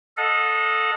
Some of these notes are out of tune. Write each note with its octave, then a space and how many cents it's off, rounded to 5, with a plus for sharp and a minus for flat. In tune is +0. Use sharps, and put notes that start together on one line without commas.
A4 +0 D#5 +0 F#5 -40